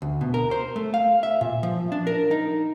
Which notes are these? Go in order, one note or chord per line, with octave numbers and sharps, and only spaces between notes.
D2
B2
A#4
C5
A3
F5
E5
A#2
F3
D4
A#4
D#4